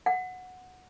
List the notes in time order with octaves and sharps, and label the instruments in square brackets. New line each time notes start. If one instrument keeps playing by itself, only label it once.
[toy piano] F#5